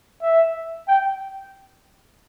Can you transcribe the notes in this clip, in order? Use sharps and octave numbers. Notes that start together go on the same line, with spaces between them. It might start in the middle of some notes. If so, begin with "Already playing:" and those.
E5
G5